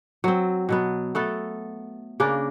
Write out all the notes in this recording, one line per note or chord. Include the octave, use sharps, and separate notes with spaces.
F#3 C4
B2 F#3 B3
A3 B3 A4
C#3 A#3 D4 A#4